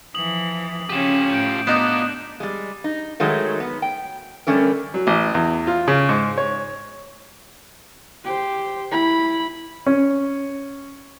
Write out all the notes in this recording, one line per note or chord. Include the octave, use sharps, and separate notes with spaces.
E3 F3 D#6 F#7
C#3 C#4 F4 G4 D#7 E7
A2 G6 D7
B3 D4 D#4 F4 D5 F#6 E7
G3 G#3
D#4
D#3 F#3 G#3 A3
B3
G5
D3 G3 A3 C#4 G4 A#4
F#3
A1
E2
F4
C#3
G#2
C#5
G4 C5
E4 B5
C#4